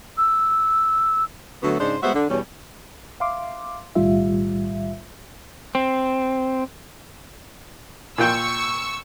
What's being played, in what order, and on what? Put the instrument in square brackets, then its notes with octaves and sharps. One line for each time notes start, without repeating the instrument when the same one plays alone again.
[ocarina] E6
[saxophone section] D3 F#3 A3 B3 F#4
G#2 C#3 D4 D#4 C5
G3 G#3 B3 F#4 C5 E5
D3
E2 B2 G3 C#4
[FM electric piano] E5 F5 C6 D6
B1 A2 D#3 G3 F4 E5
[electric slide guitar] C4
[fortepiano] A#2 F4 G5 [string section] C#6 E6